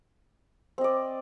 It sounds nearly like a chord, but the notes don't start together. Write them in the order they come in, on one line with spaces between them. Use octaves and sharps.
C4 D#5 D5